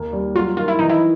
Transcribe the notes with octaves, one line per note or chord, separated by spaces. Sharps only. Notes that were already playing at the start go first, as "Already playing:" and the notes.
Already playing: D#2 A#3
G3
F#3 F4
D#3 F4
E4
E3 D#4
E4